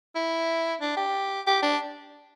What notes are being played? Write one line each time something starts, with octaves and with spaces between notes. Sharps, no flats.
E4
D4
G4
G4
D4